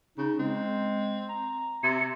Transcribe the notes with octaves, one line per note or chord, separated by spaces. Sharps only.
C#3 D#4
G#3 C4
A#5
C3 E5 C#7